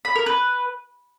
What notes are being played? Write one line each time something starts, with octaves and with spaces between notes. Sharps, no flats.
B5
A#4
B4